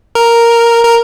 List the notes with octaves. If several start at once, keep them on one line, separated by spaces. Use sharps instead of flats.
A#4
A#4